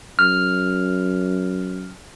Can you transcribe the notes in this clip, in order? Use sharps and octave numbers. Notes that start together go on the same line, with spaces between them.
F#2 F6